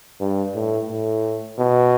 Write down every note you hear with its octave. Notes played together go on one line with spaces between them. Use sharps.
G2
A2
A2
B2